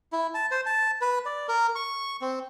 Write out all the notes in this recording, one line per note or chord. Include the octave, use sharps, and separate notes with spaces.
E4
A5
C5
A5
B4
D5
A#4
C#6
C4